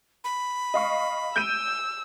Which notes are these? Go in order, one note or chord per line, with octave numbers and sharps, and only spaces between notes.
B5
D#5 F5 C#6
E6 G6 D7 D#7